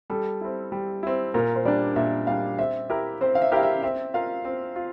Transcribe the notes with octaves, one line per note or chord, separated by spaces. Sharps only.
G3 A4
C4 E4
G3
C4 E4
A#2 A#4
C5
G3 D4 D5
A#2 E5
G3 D4 F5
C4 E5
E4 G4 A#4
C4 C5
F5
E5
E4 G4 A#4 F5
E5
C4 E5
F4 A#4 F5
C4
F4